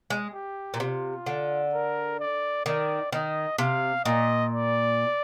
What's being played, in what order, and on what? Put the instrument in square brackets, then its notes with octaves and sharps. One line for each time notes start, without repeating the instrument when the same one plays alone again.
[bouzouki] G#3
[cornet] G4
[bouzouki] A#2
[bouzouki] C3 [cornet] F4
[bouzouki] D3
[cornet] A#4
D5
[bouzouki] D#3 [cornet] D5
[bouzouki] D#3 [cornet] D#5
[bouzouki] C3 [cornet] F5
[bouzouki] A#2 [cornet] D#5
[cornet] D5